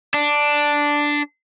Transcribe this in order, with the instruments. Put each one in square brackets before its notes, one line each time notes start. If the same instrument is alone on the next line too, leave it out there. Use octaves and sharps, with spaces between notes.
[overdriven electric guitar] D4